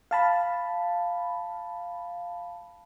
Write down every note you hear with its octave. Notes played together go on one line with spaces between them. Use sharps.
F5 A5 B5